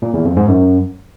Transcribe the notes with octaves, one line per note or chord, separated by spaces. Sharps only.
A#2
E2
F2
G#2
F#2